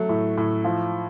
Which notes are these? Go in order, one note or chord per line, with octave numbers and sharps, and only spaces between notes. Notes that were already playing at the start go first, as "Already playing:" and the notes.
Already playing: F#3 A3
A2
A2
F3